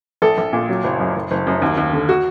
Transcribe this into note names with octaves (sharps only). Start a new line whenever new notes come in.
A#1 A4
A#1
A#2
F#3
F#1
F#2
F#1
F#1
F#2
D#2
D#2
D3
F#4